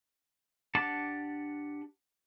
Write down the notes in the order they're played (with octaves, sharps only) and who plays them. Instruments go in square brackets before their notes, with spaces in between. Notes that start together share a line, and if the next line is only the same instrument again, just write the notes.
[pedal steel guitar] D4 G4 F#5 A5 D6